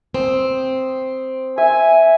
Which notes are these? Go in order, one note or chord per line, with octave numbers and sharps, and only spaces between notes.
C4 D#6
E5 G#5